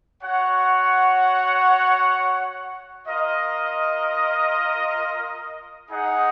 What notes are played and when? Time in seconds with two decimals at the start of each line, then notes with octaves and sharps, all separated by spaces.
0.22 F#4 C#5 F#5
3.05 F4 A#4 D#5
5.89 D#4 G#4 D#5 F#5